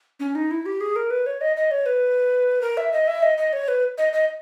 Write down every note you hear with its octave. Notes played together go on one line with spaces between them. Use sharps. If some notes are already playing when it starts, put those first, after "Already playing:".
C#4
D#4
E4
G4
G#4
A#4
B4
C#5
D#5
D#5
C#5
B4
A#4
E5
D#5
E5
D#5
D#5
C#5
B4
D#5
D#5